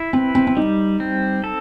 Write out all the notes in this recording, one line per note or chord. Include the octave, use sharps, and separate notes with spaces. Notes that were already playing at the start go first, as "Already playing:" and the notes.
Already playing: E4
C4 B4
C4
C4
G3 D#4
C4
A4